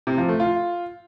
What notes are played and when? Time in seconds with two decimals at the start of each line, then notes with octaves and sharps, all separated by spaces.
0.07 C3
0.18 F3
0.29 A3
0.40 F4